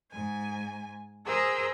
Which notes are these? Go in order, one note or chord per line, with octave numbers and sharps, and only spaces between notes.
G#2 G#5
G#4 A#4 C5 E6